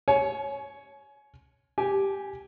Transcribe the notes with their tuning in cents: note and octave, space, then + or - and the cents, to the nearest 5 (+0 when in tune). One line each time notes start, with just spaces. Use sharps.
C#5 +0 G#5 +30
G4 +0 G#5 +0